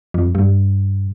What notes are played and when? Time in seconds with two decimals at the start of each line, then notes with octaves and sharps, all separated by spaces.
0.14 F2
0.35 G2